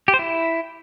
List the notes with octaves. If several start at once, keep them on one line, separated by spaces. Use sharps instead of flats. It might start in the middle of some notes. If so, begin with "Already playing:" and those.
G4
C5
E4